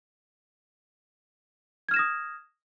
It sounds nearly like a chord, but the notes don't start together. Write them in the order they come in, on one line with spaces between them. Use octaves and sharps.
G#6 F6 E7 A#6 D#6